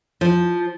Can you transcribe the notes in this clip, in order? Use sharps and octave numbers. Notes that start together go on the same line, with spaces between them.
F3